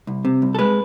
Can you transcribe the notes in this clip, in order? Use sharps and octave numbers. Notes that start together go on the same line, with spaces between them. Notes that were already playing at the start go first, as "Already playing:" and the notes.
C2
C3
C2
A4
G#3 B4